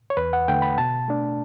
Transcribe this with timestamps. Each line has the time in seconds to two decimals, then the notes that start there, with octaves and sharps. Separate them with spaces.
0.10 C#5
0.17 E2 B4
0.33 F#5
0.48 D3 A3 G5
0.62 B5
0.78 B2 A5
1.08 A3 D4